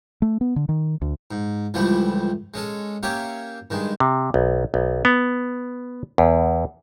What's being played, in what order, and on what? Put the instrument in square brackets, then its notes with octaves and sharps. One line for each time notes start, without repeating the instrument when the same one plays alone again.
[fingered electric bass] A3
B3
D3
D#3
D2
[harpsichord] G#2
C#2 E3 F3 G3 A3
G#3 C#4 A4
A#3 C#4 G4 C#5 E5
G2 D#3 G#3
[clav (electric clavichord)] C3
B1
B1
B3
E2